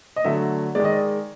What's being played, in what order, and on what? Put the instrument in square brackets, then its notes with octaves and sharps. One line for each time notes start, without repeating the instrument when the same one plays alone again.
[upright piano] D#5
D3 F#3 A3 E5
D#3 G#3 D5
D#5
D5